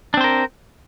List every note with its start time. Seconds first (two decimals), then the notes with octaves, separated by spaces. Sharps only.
0.14 D4
0.17 C4
0.21 C5
0.24 A#4